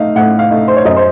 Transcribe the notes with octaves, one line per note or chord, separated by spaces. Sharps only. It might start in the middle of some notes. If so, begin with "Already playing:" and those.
Already playing: A3 D#4 F5
A2 F#5
F5
A3 D#4
C5
C#5
F#2 D#5
C5